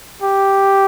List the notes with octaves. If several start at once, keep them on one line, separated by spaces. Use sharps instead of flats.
G4